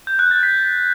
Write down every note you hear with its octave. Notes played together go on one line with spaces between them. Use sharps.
G6
F#6
A6
B6